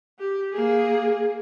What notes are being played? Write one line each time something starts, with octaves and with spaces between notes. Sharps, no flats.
G4
A#3 G#4